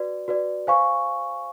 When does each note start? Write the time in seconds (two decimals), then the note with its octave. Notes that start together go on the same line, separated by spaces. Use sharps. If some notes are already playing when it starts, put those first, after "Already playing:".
Already playing: F#4 B4 D5
0.28 F#4 B4 D5
0.67 C5 F5 G#5 C#6